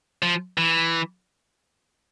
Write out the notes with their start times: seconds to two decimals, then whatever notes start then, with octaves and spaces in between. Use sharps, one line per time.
0.22 F3
0.58 E3